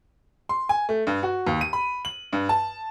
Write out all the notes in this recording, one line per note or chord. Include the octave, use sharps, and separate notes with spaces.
C6
G#5
A3
G2
F#4
D#2
D#7
B5
F#7
G2
A5